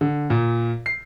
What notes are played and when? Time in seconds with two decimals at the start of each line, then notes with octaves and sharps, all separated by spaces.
0.01 D3
0.30 A#2
0.86 C7